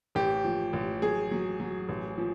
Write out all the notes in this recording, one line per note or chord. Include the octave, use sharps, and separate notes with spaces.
A1 G4
F3
A1
F#3 G#4
F#3
F#3
A1
F3